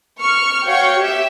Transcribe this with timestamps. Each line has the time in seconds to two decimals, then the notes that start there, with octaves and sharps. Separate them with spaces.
0.21 C#6 F6
0.66 F#4 C#5 F5 G5 C#6
0.99 G4 E5